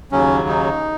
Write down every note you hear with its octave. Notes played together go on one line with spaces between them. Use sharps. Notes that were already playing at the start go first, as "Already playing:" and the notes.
D#2 C#3 F#3 C#4
D#4